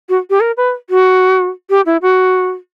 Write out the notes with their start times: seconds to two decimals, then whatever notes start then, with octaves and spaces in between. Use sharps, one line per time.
0.09 F#4
0.30 G4
0.40 A#4
0.57 B4
0.90 F#4
1.70 G4
1.86 E4
2.02 F#4